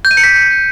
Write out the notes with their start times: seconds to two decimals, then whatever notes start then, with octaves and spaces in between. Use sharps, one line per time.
0.05 G6
0.11 D#7
0.17 C#7
0.23 B6